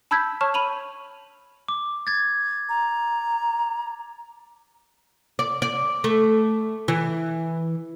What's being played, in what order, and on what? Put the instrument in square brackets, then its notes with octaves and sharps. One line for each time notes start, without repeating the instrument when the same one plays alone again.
[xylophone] A5 B5 E6 G6 G#6 B6
C#5 A5 C#6 F6
B5 D#7 F7 F#7
[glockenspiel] D6
G#6 A6
[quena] A#5
[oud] D5
D5
A3
E3